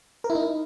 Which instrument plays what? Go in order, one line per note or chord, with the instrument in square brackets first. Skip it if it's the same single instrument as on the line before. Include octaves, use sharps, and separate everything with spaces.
[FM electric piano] A#4
E4
D#4